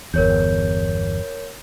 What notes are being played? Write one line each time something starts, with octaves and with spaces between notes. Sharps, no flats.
G1 E2 A#4 C#5 G6